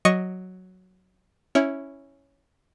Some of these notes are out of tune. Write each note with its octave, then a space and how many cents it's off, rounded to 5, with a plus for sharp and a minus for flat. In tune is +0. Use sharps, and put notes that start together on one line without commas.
F#3 +0 D#5 +0 C#6 +0
C#4 +0 E4 -5